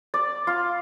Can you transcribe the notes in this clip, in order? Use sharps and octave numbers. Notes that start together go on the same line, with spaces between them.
D5
F4